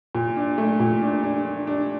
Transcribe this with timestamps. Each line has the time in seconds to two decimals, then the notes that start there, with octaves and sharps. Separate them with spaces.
0.15 A#2
0.37 D4
0.58 A3
0.80 A#2
1.02 D4
1.24 D4
1.45 D4
1.67 D4